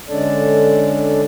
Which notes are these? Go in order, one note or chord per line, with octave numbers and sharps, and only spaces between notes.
D3 G#3 C#4 D4 A4 D5